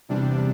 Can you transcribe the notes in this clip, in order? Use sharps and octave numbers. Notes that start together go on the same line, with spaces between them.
E2 C3 G3 D4